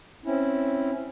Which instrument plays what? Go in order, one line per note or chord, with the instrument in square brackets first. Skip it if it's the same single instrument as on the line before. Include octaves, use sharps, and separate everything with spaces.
[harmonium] C4 C#4 E4